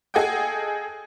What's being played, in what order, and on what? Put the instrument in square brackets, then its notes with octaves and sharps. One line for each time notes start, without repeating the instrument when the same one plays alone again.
[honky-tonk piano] G#4 A4 D#5 F#5 G5